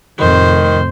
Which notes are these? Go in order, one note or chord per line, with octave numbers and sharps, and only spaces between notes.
F2 A2 C3 D#3 C5